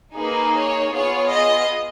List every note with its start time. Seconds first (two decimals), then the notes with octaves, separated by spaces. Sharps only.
0.17 A#3 D#4 G#4 B4
0.56 C#5
0.94 B3 F4 G#4 C#5
1.31 D#5